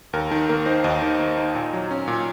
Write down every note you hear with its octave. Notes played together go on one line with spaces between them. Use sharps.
D#2 A#4
D#3 A#4
A#3 A#4
D#4 C5
D#2 D#5
D#3
A#3
D#4
A#2
F#3
C#4
A#2